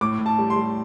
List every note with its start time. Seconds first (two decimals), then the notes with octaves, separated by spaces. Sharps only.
0.01 A2 D6
0.19 A2
0.26 A5
0.39 G3
0.50 C6
0.56 G3